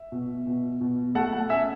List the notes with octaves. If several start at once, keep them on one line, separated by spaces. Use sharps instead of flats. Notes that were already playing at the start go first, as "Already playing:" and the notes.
Already playing: E5
B2
B2
B2
A3 F#5 A5
F#5 A5
C#4 E5 G#5